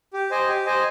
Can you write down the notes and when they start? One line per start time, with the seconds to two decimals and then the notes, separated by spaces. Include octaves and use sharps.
0.13 G4
0.31 C5 D#5 G#5
0.49 G4
0.66 C5 D#5 G#5